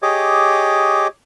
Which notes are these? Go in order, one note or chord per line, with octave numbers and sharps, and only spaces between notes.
G4 G#4 C#5 D#5 D6